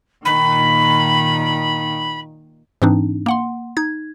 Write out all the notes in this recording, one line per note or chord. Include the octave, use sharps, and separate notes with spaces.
A#2 D#3 B5
G#2 E3 C4 D4 D#4
A#3 F#5 C6
D#4 G#6